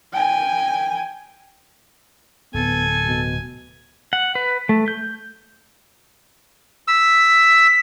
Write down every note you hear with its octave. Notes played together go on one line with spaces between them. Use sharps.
G5 G#5
D1 B3 A4 G#5
B2
F#5
B4
A3
G6
E6 B6